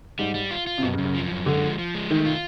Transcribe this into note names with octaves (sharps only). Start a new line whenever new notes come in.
G#2 G3
G3
F4
F4
C3
F#2 B2
C#3
F#2
C#3
F3
F#2
D3 G#3
F3
F3
G#3
D#3 A3
F4